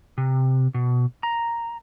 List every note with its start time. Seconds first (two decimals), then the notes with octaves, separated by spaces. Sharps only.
0.18 C3
0.74 B2
1.23 A#5